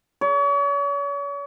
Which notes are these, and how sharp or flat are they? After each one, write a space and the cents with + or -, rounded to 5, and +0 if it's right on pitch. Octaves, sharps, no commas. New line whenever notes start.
C#5 +40